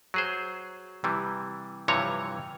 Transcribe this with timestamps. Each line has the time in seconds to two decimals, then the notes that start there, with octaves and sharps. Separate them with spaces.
0.14 F#3 G#4 C5
1.04 C3 E3 G3
1.88 G2 C3 E3 F3 C#5 A#5